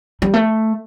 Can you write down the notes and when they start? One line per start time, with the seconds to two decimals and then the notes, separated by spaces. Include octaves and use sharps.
0.22 G3
0.33 A3